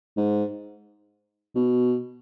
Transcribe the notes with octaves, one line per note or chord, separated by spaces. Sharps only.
G#2
B2